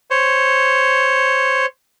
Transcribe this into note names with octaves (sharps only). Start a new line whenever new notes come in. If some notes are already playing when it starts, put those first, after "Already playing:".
C5 C#5